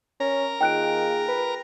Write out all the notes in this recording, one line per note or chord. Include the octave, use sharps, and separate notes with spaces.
C#4 A#4 A#5
D#3 A#3 F4 G#4 G5 F#6 D7
B4